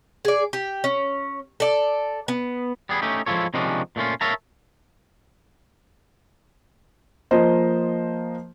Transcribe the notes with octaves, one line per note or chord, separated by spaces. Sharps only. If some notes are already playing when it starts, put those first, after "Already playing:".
G#4 D5
G4
C#4
A4 D5
B3
G3 B3 G#4
A3 C#4 D#4 G4
F3 G#3 E4 F4 A4 C#5
C3 D#3 F3 G#3 C#4 D4
A#2 A3 C#4 F4
A#4 C#5 E5 F5 A5 A#5
F3 A#3 C5 D#5